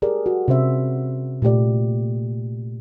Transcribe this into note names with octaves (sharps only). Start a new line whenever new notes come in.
G4 G#4 A#4 D5
F#4
C3 C#4 C5 E5
A#2 A3 G4 D5